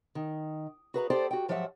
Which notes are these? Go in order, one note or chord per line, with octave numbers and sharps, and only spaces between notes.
D#3
F#4 G#4 B4 E5 A#5
G4 A4 C5 D5 G5
F#4 G5
G#2 F3 F#3 G4 E5 F#5